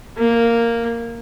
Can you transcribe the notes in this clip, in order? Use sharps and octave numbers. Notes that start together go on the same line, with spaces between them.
A#3